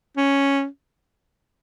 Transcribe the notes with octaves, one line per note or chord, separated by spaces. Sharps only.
C#4